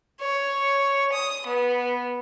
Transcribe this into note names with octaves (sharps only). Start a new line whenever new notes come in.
C#5
D#6
B3